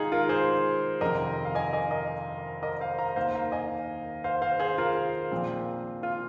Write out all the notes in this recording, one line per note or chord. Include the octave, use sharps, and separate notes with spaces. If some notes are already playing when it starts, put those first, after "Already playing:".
Already playing: G#2 D#3 D#4 F4 G#4
F4 A#4
G#4 C5
F2 C3 D#3 C4 A#4 D#5
F5
D#5 G#5
D#5 G#5
A#4 D#5
A#4 D#5
C5 F5
F5 A#5
D#2 D#3 A#3 C5 F5
F5 A#5
D#5 G#5
C5 F5
C5 F5
G#4 C5
F4 A#4
A#1 A#2 F3 C4
F4